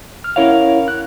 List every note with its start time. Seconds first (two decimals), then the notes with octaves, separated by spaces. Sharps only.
0.24 F6
0.36 C#4 E4 A#4 C#5 F5 F#5
0.88 F#6